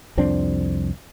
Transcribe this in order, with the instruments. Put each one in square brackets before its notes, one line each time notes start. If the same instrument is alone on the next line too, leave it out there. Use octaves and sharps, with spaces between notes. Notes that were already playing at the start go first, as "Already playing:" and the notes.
[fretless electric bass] C2 F2 C4 D4